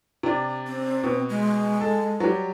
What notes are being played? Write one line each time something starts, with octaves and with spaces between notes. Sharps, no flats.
C3 D4
C4
B2
G#3
A4
F#3 G3